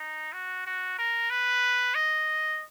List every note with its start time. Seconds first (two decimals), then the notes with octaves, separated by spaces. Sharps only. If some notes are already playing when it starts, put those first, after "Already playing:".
Already playing: D#4
0.33 F#4
0.66 F#4
0.98 A#4
1.30 B4
1.95 D#5